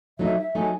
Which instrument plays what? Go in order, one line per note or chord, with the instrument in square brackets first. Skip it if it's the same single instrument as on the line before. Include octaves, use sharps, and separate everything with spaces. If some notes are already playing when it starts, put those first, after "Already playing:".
[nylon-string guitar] F#3 A3 D#4 [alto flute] E5
[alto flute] E5
[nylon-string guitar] F#3 A3 D#4 [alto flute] G#5